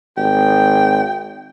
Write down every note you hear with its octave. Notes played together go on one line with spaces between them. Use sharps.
G#1 G5